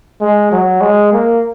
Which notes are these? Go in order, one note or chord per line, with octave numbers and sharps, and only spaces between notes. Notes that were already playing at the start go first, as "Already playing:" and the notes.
G#3
F#3
G#3
A#3